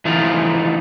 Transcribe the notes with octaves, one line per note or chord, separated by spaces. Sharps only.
E3 F3 A3 D#4 F4